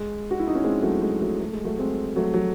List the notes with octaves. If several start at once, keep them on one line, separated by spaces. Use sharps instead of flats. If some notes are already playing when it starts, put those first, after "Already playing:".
Already playing: G#3
F#4
E4
D#4
C#4
G#3 C4
F#3 A3
G#3
F#3 A3
A3
G#3
F#3 A3
G#3 C4
F#3 A3
F#3